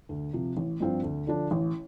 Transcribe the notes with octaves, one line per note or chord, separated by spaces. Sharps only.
D2
C3 F3
A1
G2 F3 C4 F4
D2
D3 F3 D4
A1